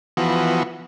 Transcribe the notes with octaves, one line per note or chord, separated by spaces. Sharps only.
E3 F3 B3 F#4